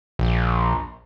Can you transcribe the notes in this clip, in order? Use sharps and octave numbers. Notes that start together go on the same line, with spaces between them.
A#1